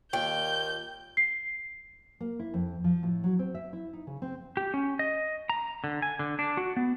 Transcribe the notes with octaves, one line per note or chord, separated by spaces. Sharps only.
D#2 A#2 G5 G6
C7
A#3
E4
F2
F3
A2
F#3
C4
E5
E4
D#4
C#3
C4
G4
C#4
D#5
A#5
D3
G#5
D3
D4
F#4
B3